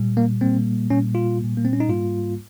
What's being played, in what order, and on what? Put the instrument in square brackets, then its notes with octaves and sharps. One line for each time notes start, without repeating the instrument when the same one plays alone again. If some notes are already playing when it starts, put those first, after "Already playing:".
Already playing: [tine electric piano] A#2 G3
A#3
A#2 G3 A#3 C4
A#2 G3 A#3 C#4
F4
A#2 G3 A#3
A#3
C4
C#4
D#4
G#2 G3 A#3 F4